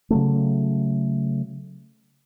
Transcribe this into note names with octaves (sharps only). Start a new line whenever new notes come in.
C#3 F#3 A3